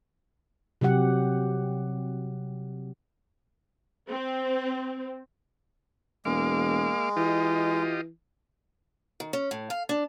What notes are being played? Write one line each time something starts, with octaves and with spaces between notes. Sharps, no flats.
C3 F#3 G4 F#5
C4
E1 G#3 A#3 F5 D6
E3 F4 G4 D#5
D#3
C#4
A2
F5
D4